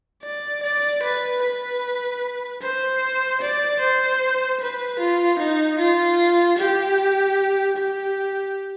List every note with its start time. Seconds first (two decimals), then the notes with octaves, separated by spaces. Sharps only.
0.23 D5
0.63 D5
1.03 B4
1.42 B4
2.62 C5
3.41 D5
3.80 C5
4.61 B4
5.00 F4
5.39 D#4
5.79 F4
6.59 G4
7.77 G4